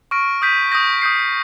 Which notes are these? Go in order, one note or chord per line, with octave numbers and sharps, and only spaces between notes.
C#6 F6 A#6 D7
D#6 G6 B6 D#7
D#6 G6 A#6
D#6 G6 C7